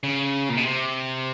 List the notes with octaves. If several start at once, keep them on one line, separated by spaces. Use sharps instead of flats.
C#3
A#2
B2
C3